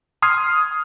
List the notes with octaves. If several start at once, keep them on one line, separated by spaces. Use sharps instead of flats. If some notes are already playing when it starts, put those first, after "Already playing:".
C6 D#6 F6 G#6 C7